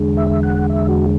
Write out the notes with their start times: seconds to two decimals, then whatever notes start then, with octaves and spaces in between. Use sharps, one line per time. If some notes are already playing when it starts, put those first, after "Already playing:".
Already playing: E2 D3 G#3
0.17 E5
0.43 F#5
0.69 E5
0.89 F#4